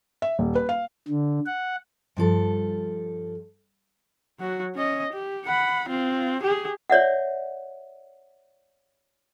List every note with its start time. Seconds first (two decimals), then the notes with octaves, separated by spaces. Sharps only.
0.22 E5
0.39 D#1
0.55 B4
0.69 F5
1.08 D3
1.46 F#5
2.17 G2 F3 A4
4.40 F#3 F#4
4.75 C#4 D#5
5.13 G4
5.46 F#5 B5
5.89 C4 F4
6.42 G4 G#4
6.90 C#5 D5 E5 F#5